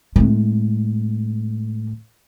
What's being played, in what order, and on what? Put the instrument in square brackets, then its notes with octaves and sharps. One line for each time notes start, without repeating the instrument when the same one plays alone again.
[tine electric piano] A2 A3 [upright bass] G#3 C4